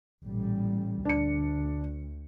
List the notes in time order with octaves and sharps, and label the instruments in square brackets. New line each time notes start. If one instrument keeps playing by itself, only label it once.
[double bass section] A1 A#2 G3
[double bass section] D2 [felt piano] D4 C#7